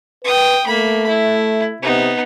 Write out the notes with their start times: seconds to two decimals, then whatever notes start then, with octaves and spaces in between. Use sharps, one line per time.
0.24 B4 G5 D#6
0.67 A3 A#3 B5
1.08 E4
1.82 C3 B3 D#4